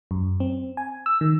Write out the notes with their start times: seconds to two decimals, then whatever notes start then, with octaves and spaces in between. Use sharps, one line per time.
0.11 F#2
0.40 C4
0.77 G#5
1.06 E6
1.21 D#3